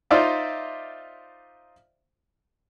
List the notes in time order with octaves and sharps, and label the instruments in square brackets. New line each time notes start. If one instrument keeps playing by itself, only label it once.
[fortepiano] D#4 F4 C5 D5 E5 F5